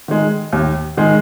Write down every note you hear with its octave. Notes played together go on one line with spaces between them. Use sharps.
D#3 G#3
D#2
D#3 G#3